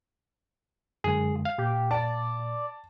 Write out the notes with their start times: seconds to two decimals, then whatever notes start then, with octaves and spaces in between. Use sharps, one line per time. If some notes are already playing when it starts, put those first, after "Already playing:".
1.04 F#2 D3 G#3 G#4
1.45 F5
1.58 A#2 G4
1.91 D5 A5